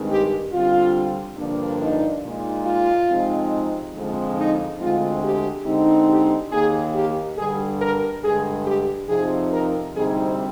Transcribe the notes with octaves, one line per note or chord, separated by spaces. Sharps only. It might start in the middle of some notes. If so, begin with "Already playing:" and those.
Already playing: G2 D#3 G#3 C4
G4
D3 G3 C4 F4
G2 D3 F3 A#3 D4
D#4
A#2 G#3 D#4
F4
C3 F3 G#3 C4 D#4
F2 D3 F3 G#3 C4
D#4
D2 D3 G#3 C4 F4
G4
D3 G#3 C4 D#4
G4
D#2 D#3 A#3 G#4
G4
G2 D3 G3 D4 G#4
A#4
G2 D3 G#3 G#4
G4
F2 C3 F3 C4 D#4 G#4
A#4
D2 C3 G3 C4 D#4 G#4